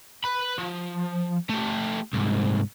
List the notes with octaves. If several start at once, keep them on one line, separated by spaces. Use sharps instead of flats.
B4 B5
F3
A3 G4
C2 G#2